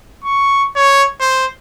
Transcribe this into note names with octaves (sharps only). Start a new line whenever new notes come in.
C#6
C#5
C5